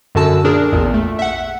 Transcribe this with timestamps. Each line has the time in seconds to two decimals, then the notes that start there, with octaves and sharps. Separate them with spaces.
0.15 F#2 D3 F#4 A5 E6
0.44 A#2 D4 G#4 A#4
0.72 A1 E2 A#2
0.94 A3
1.19 E5 F#5